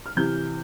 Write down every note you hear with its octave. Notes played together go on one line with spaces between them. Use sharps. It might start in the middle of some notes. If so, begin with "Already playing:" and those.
F6
C3 E3 G6